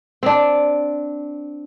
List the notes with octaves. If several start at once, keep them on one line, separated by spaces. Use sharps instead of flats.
C4 D4